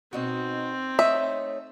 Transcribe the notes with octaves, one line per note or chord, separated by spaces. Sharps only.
B2 C4 D#4 F#4
A3 D#4 C#5 E5